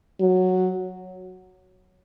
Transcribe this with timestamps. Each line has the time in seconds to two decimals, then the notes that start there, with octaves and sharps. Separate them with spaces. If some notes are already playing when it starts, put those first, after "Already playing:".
0.20 F#3